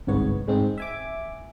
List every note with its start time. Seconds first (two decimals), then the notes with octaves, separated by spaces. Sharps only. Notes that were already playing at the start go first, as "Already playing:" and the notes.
0.07 G1 C2 G#2 B3 C#5
0.48 G#2 G#3 C4
0.78 E5 G#5 D6